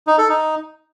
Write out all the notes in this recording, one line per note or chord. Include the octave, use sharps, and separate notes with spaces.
D#4
A4
D#4